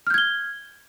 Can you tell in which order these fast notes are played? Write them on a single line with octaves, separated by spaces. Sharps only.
F6 G6 G#6 G7